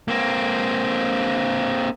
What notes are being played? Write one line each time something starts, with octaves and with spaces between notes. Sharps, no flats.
A#3 C4